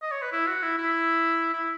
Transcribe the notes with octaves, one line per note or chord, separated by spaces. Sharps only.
D#5
C#5
B4
E4
F#4
E4
E4
E4